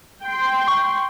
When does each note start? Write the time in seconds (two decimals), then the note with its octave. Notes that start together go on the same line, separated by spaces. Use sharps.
0.24 G5 C6
0.68 C#6